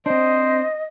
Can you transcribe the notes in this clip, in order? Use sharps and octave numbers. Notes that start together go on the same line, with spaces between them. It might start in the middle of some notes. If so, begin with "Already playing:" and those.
C4 D4 C5 D#5